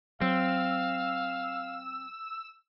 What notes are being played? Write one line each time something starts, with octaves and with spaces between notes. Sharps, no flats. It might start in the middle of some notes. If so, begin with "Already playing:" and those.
F#3 C4 F5 E6